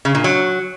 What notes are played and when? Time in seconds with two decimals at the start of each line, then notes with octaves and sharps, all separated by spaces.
0.05 C#3
0.15 A#2
0.24 F#3